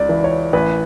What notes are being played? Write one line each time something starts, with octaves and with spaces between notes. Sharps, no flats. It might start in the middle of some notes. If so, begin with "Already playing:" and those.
Already playing: C#2 D5
E3
C#5
A1 B4